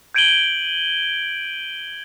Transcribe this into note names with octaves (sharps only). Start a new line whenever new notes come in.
G6 G#6 D7 D#7 F#7 G7